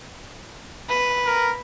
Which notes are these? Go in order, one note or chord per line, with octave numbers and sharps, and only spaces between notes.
B4
A#4